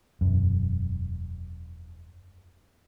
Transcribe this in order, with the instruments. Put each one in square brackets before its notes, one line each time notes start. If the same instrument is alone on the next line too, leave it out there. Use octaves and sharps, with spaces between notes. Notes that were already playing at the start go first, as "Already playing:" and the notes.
[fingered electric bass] E1 F#2